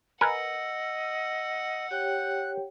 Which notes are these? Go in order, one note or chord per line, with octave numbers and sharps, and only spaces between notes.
A#4 B4 D#5 F#5 G#5 E6
G4 C#5 G5 F#6 G6